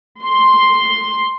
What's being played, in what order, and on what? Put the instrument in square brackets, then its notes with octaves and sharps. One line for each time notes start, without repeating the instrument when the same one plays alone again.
[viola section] C6